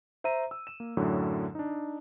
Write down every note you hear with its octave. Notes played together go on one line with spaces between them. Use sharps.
C5 E5 A#5 D#7
E6
E7
A#3
F#2 A2 D3 F#3
D4 D#4